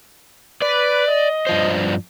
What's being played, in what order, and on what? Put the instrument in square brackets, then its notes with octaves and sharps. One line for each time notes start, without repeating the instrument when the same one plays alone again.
[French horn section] B4 [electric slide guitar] D5
[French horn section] D#5
[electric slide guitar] G2 F3 C5